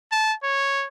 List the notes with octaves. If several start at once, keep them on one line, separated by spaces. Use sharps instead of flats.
A5
C#5